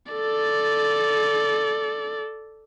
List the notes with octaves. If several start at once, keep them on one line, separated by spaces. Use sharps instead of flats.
A4 D5